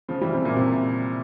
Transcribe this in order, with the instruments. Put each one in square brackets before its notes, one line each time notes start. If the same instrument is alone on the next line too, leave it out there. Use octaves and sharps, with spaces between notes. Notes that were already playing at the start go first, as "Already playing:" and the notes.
[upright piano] C#3 F3
E3 G3
C3
A#2
C3